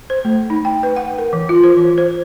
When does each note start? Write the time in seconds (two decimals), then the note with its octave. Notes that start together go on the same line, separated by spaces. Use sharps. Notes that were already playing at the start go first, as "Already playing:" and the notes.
0.10 C5
0.25 A3
0.50 D#4
0.65 G5
0.83 B4
0.96 F#5
1.18 A#4
1.33 E3
1.49 F4
1.63 C5
1.77 E3
1.98 C5